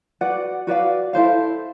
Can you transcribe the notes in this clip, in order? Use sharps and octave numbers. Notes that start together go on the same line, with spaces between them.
F#4 B4 D5 F#5
F#4 B4 D5 F5
E4 A4 C5 F5